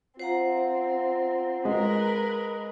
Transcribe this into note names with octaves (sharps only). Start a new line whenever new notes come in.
C4 F4 C5 F#5 A#5
G#3 A#4 B4